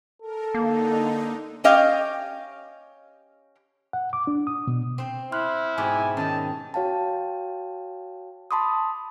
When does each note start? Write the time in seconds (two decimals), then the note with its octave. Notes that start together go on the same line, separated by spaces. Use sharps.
0.22 A4 A#4
0.55 D3 A#3 D#4
1.64 C#4 G4 D#5 F5 G5
3.93 F#5
4.13 D6
4.27 D4
4.47 D#6
4.67 B2
4.98 C4 C5
5.32 E4 C6 F6 F#6
5.78 G#2 B2 G4 G#5
6.17 D#3 C#4 D#5 A5
6.74 F#4 C#5 F5 G5 A5
8.51 A5 B5 C6 D6 D#6